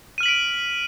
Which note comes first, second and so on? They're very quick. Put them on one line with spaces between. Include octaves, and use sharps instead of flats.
D#7 F6 F#7 B6 D7